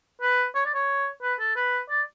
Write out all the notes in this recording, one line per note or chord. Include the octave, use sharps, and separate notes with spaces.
B4
C#5
D5
C#5
B4
A4
B4
D5